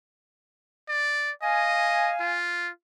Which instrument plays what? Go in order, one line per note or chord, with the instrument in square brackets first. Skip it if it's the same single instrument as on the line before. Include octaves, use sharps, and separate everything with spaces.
[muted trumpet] D5
[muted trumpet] D#5 [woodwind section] F5 G#5
[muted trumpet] F4